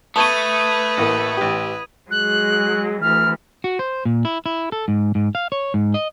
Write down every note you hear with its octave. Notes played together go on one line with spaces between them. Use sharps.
A3 B4 A5 C#6 D#6 G#6 D#7
A1 A2 A#3
A1 G4
F#3 G#3 F#6
D2 E3 F6
F#4
C5
A#2
E4
E4
A4
G#2
G#2
F5
C#5
G#2
D#5